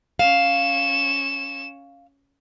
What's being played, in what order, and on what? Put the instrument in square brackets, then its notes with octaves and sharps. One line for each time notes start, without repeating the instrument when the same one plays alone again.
[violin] C#4 E7 [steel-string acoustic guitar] F5